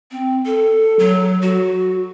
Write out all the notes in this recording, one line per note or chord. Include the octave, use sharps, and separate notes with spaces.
C4
A4
F#3
F#4